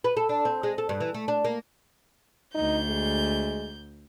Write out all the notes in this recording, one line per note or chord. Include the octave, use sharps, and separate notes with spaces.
B4
A4
D4
C4
G#3
A4
G2
E3
A3
D4
A#3
D2 D#4 G6
G#3